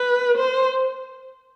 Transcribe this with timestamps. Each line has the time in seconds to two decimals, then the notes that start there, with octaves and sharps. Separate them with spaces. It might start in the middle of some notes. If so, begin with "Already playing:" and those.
Already playing: B4
0.37 C5